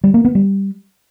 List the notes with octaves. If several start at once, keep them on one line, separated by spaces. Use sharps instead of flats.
G3
A#3
B3
G3